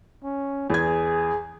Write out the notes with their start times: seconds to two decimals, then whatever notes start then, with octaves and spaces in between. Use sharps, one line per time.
0.24 C#4
0.70 E2 G#4 G#6